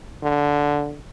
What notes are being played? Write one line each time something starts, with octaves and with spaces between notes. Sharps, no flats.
D3